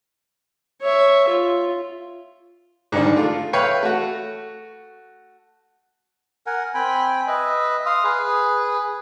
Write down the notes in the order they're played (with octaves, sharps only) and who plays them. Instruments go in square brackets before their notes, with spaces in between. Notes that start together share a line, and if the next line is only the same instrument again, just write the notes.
[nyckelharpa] C#5 E5
F4
[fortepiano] G#2 D3 D#3 G3 D4
A3 F4
B4 C#5 E5 F5 G5 C#6
A3 F#4
[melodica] A#4 F#5 G#5
C4 G5 G#5 B5
B4 D#5 E5
F5 C6 D#6
G#4 B4